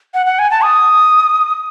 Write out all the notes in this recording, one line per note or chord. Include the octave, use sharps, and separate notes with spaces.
F#5
F#5
G#5
A5
D#6